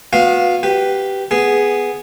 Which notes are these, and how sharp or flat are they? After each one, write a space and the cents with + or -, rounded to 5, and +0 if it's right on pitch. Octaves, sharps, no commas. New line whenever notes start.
B3 -5 F#4 -35 F5 +0
G4 -10 B4 +0
B3 +0 G#4 +0